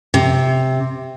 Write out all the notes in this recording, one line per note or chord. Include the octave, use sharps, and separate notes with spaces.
C3